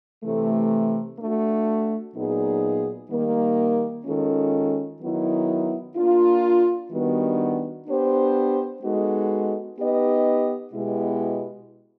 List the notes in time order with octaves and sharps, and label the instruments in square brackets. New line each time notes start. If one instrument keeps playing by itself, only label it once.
[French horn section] C3 E3 A3
A3 D4 F#4
A#2 F#3 B3 D#4 G#4
D#3 G3 A#3
D#3 G#3 C#4 F4 A4
D#3 F#3 B3 E4
A#3 D4 F4
D#3 G3 B3 D4 F#4
B3 D4 G4 C5
G#3 B3 D#4 F#4 A4
B3 D#4 G4 B4 D#5
B2 G#3 B3 E4 G4